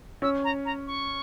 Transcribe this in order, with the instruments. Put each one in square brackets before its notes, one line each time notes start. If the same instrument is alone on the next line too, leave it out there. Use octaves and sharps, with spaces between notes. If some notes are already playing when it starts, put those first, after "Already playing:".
[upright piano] C#4 [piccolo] E6
[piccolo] A#5
A#5
C#6